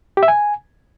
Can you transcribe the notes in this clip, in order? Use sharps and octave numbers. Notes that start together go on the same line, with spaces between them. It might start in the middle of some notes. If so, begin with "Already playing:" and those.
G4
E5
G#5